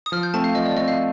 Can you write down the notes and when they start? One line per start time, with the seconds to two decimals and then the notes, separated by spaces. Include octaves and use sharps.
0.06 D#6
0.12 F3 F6
0.23 G6
0.34 A3 C4 A5
0.44 F5
0.55 F3 D#5
0.66 D5
0.77 A3 C4 D#5
0.88 F5